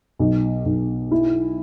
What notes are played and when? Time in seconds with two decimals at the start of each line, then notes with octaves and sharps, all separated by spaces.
0.19 B1
0.65 B1
1.11 E4